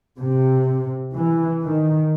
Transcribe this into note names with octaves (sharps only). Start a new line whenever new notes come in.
C3
E3
D#3